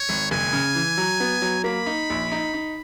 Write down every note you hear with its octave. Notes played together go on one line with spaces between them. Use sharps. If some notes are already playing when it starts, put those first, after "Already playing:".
Already playing: C#5
G#1
F#1 G#5
C#3
E3
F#3
B3
F#3
A#3 B5
D#4
A#1
D#4
D#4